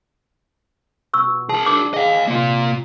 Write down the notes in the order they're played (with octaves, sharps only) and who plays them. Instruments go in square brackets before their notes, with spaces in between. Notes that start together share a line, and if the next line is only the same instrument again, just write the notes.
[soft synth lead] B2 [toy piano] C#6 E6
[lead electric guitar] G#4 A#4 [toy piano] A5
[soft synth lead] D4 [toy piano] D6
[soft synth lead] G#4 [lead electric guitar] D#5 F5
[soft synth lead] C3 [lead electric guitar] A#3 F4